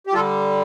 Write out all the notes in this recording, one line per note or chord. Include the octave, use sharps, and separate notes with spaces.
G4
D3 G3 F4 A4